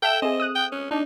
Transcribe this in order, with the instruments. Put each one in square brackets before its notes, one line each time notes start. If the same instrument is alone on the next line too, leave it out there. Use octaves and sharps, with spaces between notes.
[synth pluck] A4 E5 E7 [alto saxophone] G5
[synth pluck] C4 G#4 [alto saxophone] D#5
[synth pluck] D#6 F#6
[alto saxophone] G5
C#4
[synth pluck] D4 [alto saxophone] D#4